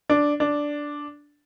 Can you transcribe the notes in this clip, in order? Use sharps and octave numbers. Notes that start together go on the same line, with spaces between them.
D4
D4